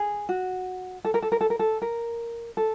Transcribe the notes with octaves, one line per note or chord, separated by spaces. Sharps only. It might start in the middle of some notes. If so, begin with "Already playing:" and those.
Already playing: G#4
F#4
A4
A#4
A4
A#4
A4
A#4
A4
A#4
A4